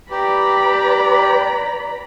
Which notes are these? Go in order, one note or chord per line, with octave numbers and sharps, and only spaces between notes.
G4 B4 D5 A#5 B5